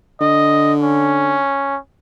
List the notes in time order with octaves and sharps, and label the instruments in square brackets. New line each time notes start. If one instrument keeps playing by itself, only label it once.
[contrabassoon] D3 [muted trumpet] D#5
[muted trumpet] C#4